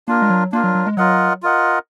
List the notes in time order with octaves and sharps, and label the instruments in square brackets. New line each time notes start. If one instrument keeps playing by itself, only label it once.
[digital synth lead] A#3 [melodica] D4 F4 A#4
[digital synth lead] G#3
F#3
[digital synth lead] A#3 [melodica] D4 F4 A#4
[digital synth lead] F#3
F#3
G#3
[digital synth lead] F#3 [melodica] F4 A#4 D#5 F#5
[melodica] F4 A#4 D#5 F#5